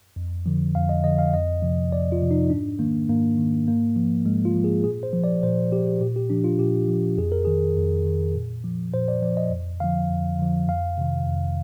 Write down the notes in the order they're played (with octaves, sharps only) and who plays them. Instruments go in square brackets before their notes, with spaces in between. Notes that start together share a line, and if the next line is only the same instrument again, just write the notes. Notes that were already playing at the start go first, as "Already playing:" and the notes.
[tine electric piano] F2
D3 F3
F2 F5
D#5
D3 F3 D#5
F5
F2 D#5
C3 F3
F2 D5
F4
C3 F3
D#4
G#2 D4
D#3 A#3
G#2 A#3
D#3
G#2 A#3
F3
G#2 G#3
F4
F3
G#4
A#2 G#4
C5
F3
D5
A#2 C5
F3 G4
A#2 G4
G4
F3 D4
F4
A#2 G4
F3
F2 G#4
A#4
D#3 G#4
F2
D#3
A#2
F3
A#2 C5
D5
F3 D5
D#5
F2
D3 F3 F5
F2
D3 F3
F2 F5
C3 D#3
F2